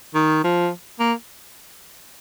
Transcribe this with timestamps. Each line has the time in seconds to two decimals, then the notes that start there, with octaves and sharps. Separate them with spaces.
0.15 D#3
0.44 F3
1.00 A#3